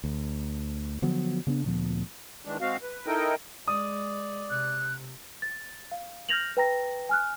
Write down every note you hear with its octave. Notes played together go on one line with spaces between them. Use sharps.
D2
D3 F3 F#3 B3
C#3 B3 C#4 D4
D2 A#2 F3 B3
D#3 E3 G#3 D4
G#3 C4 F#4 F5
B4
D#4 E4 A4 A#4 D#5 G5
G#3 D5 D#6
C3 F#6
A6
F5
F6 G6 G#6 A#6 F7 F#7
B4 G5 A#5 A#6
G#5 F6 F#6